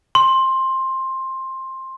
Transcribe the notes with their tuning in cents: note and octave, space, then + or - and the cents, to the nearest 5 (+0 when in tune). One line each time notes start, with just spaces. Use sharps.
C6 +15